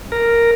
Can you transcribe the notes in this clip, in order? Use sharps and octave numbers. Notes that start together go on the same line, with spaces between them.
A#4